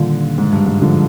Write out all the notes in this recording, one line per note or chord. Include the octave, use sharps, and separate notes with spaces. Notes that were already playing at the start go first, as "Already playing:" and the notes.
Already playing: A#2 D3 D#3 G3 D4 F4
G#2
G2
G#2
D3 F3